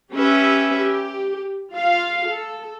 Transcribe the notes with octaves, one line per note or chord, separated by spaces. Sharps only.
C#4 G4 B4 E5
G4
F4 F5
A4